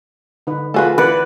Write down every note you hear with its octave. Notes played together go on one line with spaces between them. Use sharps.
D3 D#4 B4
F3 A3 F4 F#4 G#4 A4 B4
E3 B4 D5 F#5